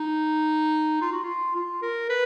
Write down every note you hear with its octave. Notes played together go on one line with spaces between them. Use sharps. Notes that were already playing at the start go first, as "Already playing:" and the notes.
Already playing: D#4
F4
F#4
F4
F4
A#4
B4